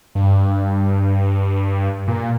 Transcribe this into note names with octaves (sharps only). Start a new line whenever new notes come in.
G2
A#2